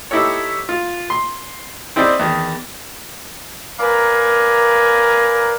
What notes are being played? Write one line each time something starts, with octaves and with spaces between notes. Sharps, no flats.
D#4 E4 G4 A4 C#5
F4
C6
C4 E4 G#4 C5 D5 D#5
E2 D#3
A#4 B4 D5 F5 G#5 A#5